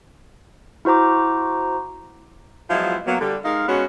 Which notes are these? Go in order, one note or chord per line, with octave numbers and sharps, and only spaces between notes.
E4 F#4 C5 A#5 D6
F3 F#3 G#3 B3 E4 F4
F#3 A#3 B3
D3 G3
G#3 D#4 A#4 F5
G#3 B3 C#4 F#4